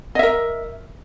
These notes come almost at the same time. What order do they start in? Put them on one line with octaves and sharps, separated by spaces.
D#5 E5 A#4